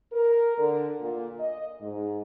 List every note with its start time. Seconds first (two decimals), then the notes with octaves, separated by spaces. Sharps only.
0.13 A#4
0.58 D3
1.00 A#2
1.40 D#5
1.81 G#2